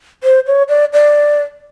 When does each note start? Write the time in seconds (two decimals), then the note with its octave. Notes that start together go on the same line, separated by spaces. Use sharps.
0.24 C5
0.47 C#5
0.69 D5
0.93 D5